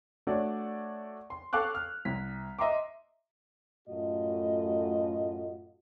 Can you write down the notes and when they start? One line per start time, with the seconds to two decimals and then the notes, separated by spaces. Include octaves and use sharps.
0.27 A3 D4 F#4 C#5 D5
1.30 C6
1.53 A4 F5 C#6 D6 F#6
1.75 F6
2.05 C2 B6
2.59 D#5 E5 A#5 C6 D6
3.88 F#2 A2 A3 F4 F#4 D#5